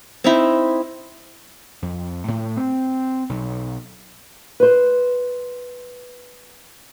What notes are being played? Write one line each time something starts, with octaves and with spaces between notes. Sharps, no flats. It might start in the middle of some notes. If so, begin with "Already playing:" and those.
C4 D#4 E4
F2
A2
C4
B1
B4 C5